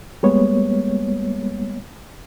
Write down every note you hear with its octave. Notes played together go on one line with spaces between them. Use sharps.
G3 G#3 A#3 B3 C#5